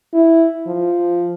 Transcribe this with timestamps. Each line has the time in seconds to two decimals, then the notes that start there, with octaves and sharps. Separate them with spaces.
0.13 E4
0.67 F3